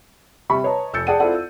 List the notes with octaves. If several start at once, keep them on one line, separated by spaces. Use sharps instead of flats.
C3 G3 B5 C#6
B4 C#5 D#5 A5 A#5
F1 E6 G6 A6 C#7
G#4 D5 F#5 G5 A5 D#7
C4 E4 F4 A4 D5 F#5
E6